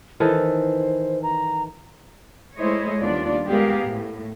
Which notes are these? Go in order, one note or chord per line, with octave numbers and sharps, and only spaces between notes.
D#3 E3 A4 C5
A#5
G#3 A3 E4 C5 C#5 D#5
D#2 G3 B3 D4 F4 D5
G#3 B3 G4 G#4 A#4 F5
A2